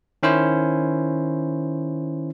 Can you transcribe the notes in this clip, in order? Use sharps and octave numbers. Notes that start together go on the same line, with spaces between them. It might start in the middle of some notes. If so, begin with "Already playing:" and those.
D#3 C#4 E4 C5